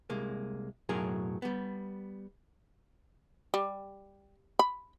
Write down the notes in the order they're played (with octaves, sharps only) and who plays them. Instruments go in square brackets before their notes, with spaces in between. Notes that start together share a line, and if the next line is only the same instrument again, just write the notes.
[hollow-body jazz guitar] C2 G#3 A#3
B1 F#2 A2 F#3 G#4 A#4
G3 B3
[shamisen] G3
B5